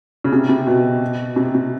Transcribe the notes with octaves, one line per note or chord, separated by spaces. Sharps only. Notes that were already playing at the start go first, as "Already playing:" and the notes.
C#3
C3
C3
B2
C3
C3